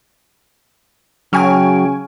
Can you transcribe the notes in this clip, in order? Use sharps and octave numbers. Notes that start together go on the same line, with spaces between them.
C#3 F#3 G5 G#5 C#6 F6